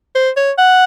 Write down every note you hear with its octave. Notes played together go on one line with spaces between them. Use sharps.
C5
C#5
F#5